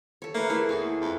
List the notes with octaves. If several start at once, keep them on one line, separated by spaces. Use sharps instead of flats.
A4 C#5
A3 A#3 B4
A3 E4 G#4
E2 G#4 A4
F2